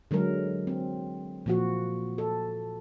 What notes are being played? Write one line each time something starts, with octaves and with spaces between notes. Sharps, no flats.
D3 F#3 G#3 A#4
C4
A#2 F3 F#4
A4